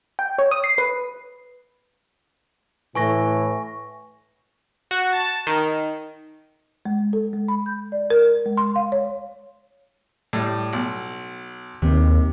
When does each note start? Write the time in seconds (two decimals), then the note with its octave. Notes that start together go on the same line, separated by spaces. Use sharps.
0.19 G5
0.38 C#5
0.51 D#6
0.64 C7
0.78 B4
2.95 A2 E3 G#5 C#6 A#6
4.91 F#4
5.13 A5
5.47 D#3
6.85 G#3
7.13 A4
7.33 G#3
7.48 B5
7.66 G6
7.92 D5
8.10 A#4
8.46 G#3
8.58 C6
8.76 F5
8.92 C#5
10.33 A2 G3
10.73 B1
11.82 D#2 C3